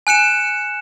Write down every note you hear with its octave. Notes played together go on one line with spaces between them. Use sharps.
G#5 F#6 C#7 E7